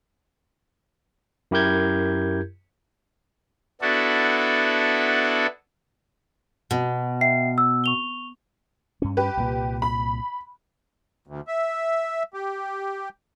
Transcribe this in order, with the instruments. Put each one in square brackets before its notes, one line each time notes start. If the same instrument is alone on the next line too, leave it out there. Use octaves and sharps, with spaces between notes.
[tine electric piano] F#2 E4 G4 A#4 G6 G#6
[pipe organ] B3 D4 E4 F#4 A4
[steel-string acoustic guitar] B2
[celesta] E5 G5 C7
E6
C#6 F7 G7
[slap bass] G2 C#4
[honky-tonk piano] G4 B4
[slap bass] C2 A#2
[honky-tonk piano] B5
[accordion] D2
E5
G4